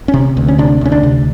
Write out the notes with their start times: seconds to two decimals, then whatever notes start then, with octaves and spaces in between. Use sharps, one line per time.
0.08 C#4
0.14 C3
0.37 D2
0.48 C#4
0.58 C3 D4
0.81 D2 C#4
0.92 D4
1.03 C3